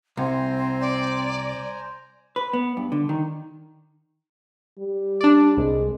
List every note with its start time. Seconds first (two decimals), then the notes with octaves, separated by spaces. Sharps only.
0.17 C2 C4 C5 G#5 A#5
0.81 D5
2.36 B4
2.53 B3
2.77 G2
2.92 D3
3.09 D#3
4.78 G3
5.21 D4 D5
5.57 C2 G#3